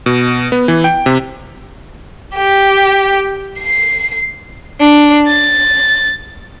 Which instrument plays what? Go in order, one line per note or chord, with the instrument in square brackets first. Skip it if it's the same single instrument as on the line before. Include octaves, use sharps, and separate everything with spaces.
[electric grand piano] B2
B3
E3
G5
C3
[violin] G4
C7
[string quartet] D4
A6